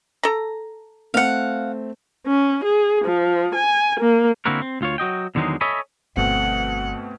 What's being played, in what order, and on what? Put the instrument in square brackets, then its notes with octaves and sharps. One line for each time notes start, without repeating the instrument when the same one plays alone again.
[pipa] A4 A#5
[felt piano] A3 C4 [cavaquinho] F5 F#5
[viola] C#4
G#4
F3
G#5
A#3
[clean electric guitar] D3 A#3 C4 E4 F#4 A#4
C4
D2 F4 C#5
F#3 F#4 D#5 G5
E2 D3 D#3 F#3 G#3 D#4
A4 C#5 D#5 E5 G#5 B5
[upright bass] G1 [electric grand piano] B2 A3 C4 [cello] F#5